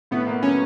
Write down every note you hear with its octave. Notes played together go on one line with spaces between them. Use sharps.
A2 B3
A#3
F#3 C#4